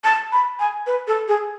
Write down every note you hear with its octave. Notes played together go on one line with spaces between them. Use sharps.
A5
B5
G#5
B4
A4
G#4